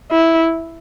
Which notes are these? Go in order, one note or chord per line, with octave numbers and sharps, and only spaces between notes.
E4